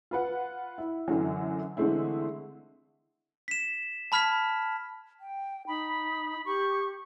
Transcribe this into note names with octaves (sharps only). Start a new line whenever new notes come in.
F4 B4 F#5
E4
F#2 D3 E3 F#3
D3 E3 G#3 A3 C4 E4
B6 E7
A5 B5 F6 G#6 B6
G5
D#4 B5
G4 C#6